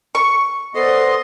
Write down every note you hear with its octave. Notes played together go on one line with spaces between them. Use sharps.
C#6
B3 A4 C5 D5 D#5 C6